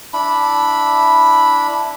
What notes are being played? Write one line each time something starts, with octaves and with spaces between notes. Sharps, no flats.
D4 E4 B5